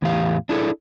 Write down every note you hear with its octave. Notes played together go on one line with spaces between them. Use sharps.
E2 A2 E3 G4 F5
D4 E4 G#4 A4